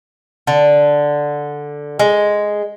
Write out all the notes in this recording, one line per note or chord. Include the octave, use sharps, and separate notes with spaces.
D3
G#3